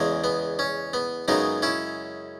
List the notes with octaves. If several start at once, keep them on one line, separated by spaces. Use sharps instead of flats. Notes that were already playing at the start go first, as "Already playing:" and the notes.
Already playing: E2 C#3 G#3
B3
C#4
B3
F#2 C#3 G#3 B3 D#4
C#4 E4